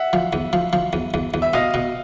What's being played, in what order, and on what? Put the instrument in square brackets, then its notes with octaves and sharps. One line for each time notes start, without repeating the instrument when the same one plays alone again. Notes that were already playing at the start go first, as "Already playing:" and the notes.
Already playing: [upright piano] E5 F#5
[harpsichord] F3
E2
F3
F3
E2
E2
E2
[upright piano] E5
[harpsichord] B2 [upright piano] D#5 F5
[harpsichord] B2